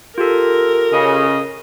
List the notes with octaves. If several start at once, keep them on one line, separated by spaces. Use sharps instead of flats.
F4 G4 A4 A#4
C#3 D#5